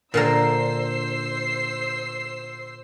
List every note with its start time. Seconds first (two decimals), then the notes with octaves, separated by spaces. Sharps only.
0.14 A#2 D3 A#4 C5 E6 C7